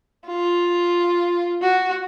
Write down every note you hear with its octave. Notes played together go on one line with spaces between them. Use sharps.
F4
F#4